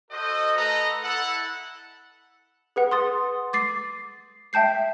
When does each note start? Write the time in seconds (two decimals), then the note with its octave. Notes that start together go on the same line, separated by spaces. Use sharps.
0.10 F#4 A4 C5 D#5
0.55 A3 A4 B4 D#5 F#5 A#5
1.02 E4 A4 F#5
2.76 G#4 B4 F#5
2.91 C6 D#6 A6
3.53 D6 A6 C7
4.53 E5 G5 A5 G6 C7